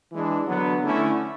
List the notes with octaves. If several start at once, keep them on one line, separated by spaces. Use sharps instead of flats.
E3 G#3 D4
D3 F#3 B3
D3 A3 C#4 E4